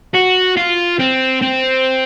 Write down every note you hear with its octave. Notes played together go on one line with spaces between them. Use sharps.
F#4
F4
C4
C4